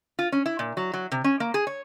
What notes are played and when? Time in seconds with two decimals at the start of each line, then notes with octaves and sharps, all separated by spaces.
0.19 F4
0.32 C#4
0.46 E4
0.59 A#2
0.77 F#3
0.93 F#3
1.12 C3
1.24 C#4
1.40 A#3
1.54 G#4
1.67 C#5